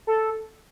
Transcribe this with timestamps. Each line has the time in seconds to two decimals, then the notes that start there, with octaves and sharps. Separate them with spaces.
0.07 A4